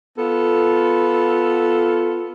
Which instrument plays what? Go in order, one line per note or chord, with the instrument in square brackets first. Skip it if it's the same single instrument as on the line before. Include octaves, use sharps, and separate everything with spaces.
[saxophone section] B3 F4 A4